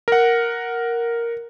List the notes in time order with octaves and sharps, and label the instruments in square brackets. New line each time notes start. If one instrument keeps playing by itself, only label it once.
[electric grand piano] A#4 F#5